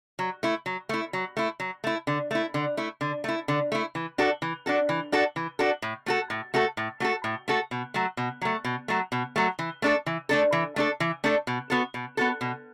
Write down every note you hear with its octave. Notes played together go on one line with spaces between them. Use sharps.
F#3
A3 E4
F#3
A3 E4
F#3
A3 E4
F#3
A3 E4
D3
A3 E4
D3
A3 E4
D3
A3 E4
D3
A3 E4
E3
D4 F#4 A4
E3
D4 F#4 A4
E3
D4 F#4 A4
E3
D4 F#4 A4
A2
A3 F#4 A4
A2
A3 F#4 A4
A2
A3 F#4 A4
A2
A3 F#4 A4
B2
F#3 A3
B2
F#3 A3
B2
F#3 A3
B2
F#3 A3
E3
A3 D4 A4
E3
A3 D4 A4
E3
A3 D4 A4
E3
A3 D4 A4
B2
B3 F#4 A4
B2
B3 F#4 A4
B2